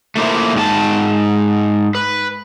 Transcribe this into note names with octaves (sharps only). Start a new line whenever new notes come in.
A3 A#3 E4 C5
G#2 G4 A5
B4